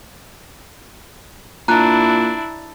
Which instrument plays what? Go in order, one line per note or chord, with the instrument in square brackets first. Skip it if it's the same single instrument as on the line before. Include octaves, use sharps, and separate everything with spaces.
[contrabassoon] A#2 [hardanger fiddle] D4 E4 [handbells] A#5 F#6